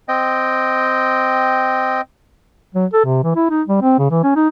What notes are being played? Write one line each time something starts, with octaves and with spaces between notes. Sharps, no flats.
C4 D#5 G5
F#3
A4
C3
E3
E4
D#4
G3
C4
C#3
E3
C#4
D#4